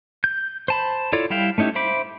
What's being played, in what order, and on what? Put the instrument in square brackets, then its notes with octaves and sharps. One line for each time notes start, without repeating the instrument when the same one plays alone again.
[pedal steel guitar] G6
C5 A5 B5
E4 F4 A4 C#5 D5
G3 E4 E5 F5 G5
A3 C#4 D#4 E4 G4
C5 E5 B5 D6